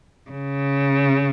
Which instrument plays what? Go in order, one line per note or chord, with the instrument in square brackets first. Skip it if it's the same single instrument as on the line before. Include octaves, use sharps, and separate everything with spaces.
[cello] C#3